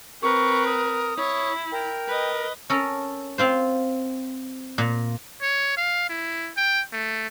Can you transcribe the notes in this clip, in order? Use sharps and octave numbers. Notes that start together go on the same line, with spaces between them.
C4 A#4 B4 C#6
D#6
E4 C#5
A#4 G5
B4 D#5
C#4 A4 A#4
C4 F4 C5
A#2
C#5
F5
E4
G5
A3